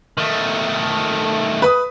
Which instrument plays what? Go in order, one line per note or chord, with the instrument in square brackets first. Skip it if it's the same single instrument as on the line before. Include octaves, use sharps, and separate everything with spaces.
[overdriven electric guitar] D#3 A3
[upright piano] B4 B5 D#6